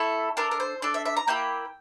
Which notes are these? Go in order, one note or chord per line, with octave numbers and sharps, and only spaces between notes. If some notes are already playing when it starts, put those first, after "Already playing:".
Already playing: A3 E4 A4
D4 A4 A#4
A#4
C5
D4 A4 D5
E5
E5
A#5
A#3 E4 G4 G5